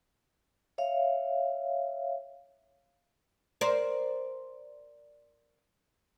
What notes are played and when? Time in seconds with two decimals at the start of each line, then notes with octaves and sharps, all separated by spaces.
0.78 C#5 E5 F5
3.61 A#4 C5 D5